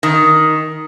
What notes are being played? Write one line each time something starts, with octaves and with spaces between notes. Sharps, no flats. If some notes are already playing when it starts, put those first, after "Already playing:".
D#3